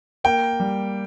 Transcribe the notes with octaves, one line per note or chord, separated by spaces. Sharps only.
A#3 G5
G3